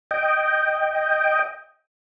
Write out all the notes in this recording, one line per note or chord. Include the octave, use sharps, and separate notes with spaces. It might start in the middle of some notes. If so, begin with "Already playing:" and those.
D#5 G5